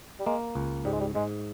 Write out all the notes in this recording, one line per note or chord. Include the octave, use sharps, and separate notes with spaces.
G3
G#3 A#3
C#2
G#2 G3
G#3
G3
G#2 G#3